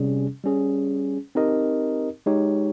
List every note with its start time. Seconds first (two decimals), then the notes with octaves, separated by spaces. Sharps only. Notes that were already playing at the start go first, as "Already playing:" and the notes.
Already playing: C3 G3 C#4 G#4
0.44 G3 C#4 G#4
1.35 C4 D#4 G4 A#4 D#5
2.26 G#3 D#4 G4 C#5